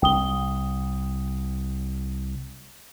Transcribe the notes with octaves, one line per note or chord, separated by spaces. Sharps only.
C2 G5 D#6 G7